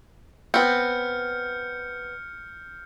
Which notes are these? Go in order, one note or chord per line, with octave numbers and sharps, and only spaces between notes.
B3 C4 F6 G6 C#7